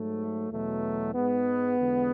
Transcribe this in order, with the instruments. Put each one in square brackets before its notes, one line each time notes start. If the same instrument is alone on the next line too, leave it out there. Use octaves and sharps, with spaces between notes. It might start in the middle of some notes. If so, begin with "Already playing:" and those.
Already playing: [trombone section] G#2 F#3 A3
E2 B2 F#3 A3
G#2 G#3 B3
E2 D3 G#3